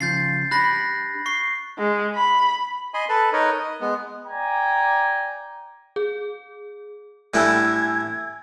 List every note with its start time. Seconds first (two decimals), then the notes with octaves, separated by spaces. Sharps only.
0.01 C#3 F3 G6 A6 C7
0.51 D4 G4 B5 F#6 A#6 B6
1.26 C#6 C7
1.78 G#3
2.15 B5
2.94 D#5 G#5 B5 C6
3.09 A4 B4 A5 B5
3.33 D#4 A#4 B4 C#5 D#5
3.59 D#5
3.81 G#3 B3
4.26 D5 G5 G#5 A#5
5.96 G#4
7.34 A2 G3 D4 E5 G#5 E6 G#6